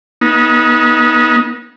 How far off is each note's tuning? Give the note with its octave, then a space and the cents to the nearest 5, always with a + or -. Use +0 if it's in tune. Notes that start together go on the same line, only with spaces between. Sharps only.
B3 -30 D#4 +10